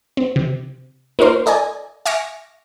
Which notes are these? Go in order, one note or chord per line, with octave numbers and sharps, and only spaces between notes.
C4
C3
A#3 D#4 F4 A#4 C5
A4 D5 D#5 G#5
E5 G#5 C#6 D6 F6 A#6